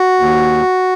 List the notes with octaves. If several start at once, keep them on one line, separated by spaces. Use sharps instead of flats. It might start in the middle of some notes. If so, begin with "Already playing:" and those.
Already playing: F#4
D#2